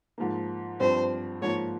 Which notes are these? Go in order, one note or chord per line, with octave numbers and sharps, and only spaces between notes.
G#2 F3 A#3
G2 F3 C4 C5
G#2 F3 A#3 C#5